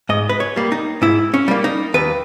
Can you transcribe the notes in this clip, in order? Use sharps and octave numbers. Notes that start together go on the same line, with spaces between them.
G#2 D#5
B4
C#5
G3 A#3
D#4
G#2 E4
C#4
G3 A#3
D#4
D#2 B4